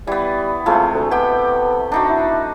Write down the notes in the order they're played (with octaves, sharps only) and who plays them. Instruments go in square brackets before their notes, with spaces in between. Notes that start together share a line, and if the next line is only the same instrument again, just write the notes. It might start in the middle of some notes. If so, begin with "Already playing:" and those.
[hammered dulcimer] E3 B3 [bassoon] G3
[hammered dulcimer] C3 G#3 A3 [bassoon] F4
[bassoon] D2
[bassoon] B3 [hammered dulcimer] G4 G5
[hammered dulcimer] D4 D#4 F#4
[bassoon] E4